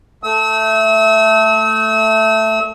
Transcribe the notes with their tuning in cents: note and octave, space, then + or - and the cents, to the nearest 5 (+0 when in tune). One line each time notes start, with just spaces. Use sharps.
A3 +0 E6 -40